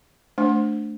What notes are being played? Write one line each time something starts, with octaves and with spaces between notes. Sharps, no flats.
A3 D4 C5